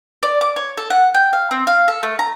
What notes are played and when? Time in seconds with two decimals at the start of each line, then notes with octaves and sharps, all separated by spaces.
0.23 D5
0.41 D6
0.56 C#5
0.77 A4
0.90 F#5
1.14 G5
1.33 F5
1.51 C4
1.67 F5
1.88 A4
2.03 A3
2.19 A#5